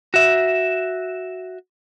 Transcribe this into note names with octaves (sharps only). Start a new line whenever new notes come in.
F#4 E5